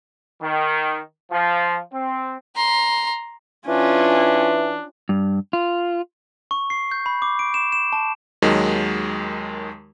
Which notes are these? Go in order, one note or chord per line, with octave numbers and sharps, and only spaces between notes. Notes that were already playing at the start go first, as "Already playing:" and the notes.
D#3
F3
C4
A#5 C6
E3 C#4 D4 F4
G2
F4
C#6
C7
G6
B5
D6
D7
E7
E7
A5
D#2 D#3 F#3 G#3